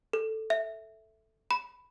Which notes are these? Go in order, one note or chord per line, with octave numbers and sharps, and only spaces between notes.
A4
E5
B5